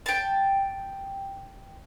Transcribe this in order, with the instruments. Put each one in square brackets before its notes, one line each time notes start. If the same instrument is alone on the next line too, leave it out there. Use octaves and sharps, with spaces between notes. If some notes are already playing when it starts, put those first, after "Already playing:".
[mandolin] G5 A5